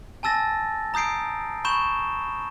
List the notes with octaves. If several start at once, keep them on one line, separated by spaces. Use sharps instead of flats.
G#5 A5 E6 A6 A#6
A#5 D#6 G6 C7 D7
B5 C#6 G6 E7 G7